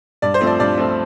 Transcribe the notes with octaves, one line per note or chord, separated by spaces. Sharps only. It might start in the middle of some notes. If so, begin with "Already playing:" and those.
G2 D5
C5
F3 A3 C4
D5
G2 D5
F3 A3 C4